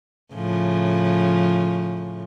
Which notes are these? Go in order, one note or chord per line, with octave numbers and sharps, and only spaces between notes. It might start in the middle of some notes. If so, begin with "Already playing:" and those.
A2 C#3 F3